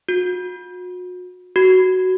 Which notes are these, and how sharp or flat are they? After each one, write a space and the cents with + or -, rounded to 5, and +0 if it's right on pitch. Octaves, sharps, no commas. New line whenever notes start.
F#4 -40
F#4 +10